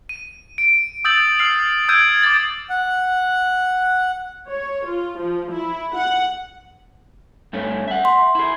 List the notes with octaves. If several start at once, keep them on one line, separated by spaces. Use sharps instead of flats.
D#7
D7
D#6 E6 G6 A6 F#7
E6 F6 C7 F#7
E6 F6 G6 G#6 D7 D#7
D6 G#6 A6 F#7
F#5
C#5
F4
F3
E4
F#5
G2 A3 C#4
E5 F#5
C6
E4 G#4